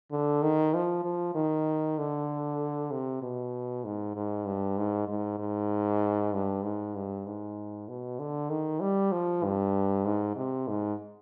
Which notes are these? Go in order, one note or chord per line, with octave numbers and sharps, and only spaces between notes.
D3
D#3
F3
F3
D#3
D3
C3
B2
G#2
G#2
G2
G#2
G#2
G#2
G2
G#2
G2
G#2
B2
D3
D#3
G3
F3
G2
G#2
C3
G#2